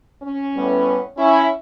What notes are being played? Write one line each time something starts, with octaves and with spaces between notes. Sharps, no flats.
C#4
A2 G3 B3
C#4 E4